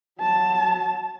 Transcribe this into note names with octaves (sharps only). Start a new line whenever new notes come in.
F#3 A5